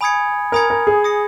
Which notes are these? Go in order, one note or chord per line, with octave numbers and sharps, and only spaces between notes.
G#5 B5 D#6 G#6 C#7
A#4 G#5 B5 D#6 G#6 C#7
A#4
G#4
D#6 A#6 C#7